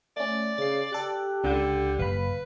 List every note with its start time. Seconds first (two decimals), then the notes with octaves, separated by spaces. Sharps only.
0.17 A3 C#4 D5
0.58 C#3 A6 C7
0.93 G4 A4 F#6
1.44 C#2 D3 G6
1.99 F#1 B4 F5 B5